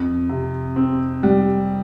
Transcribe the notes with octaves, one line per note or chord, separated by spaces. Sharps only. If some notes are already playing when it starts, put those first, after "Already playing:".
Already playing: F2
C3
C4
G3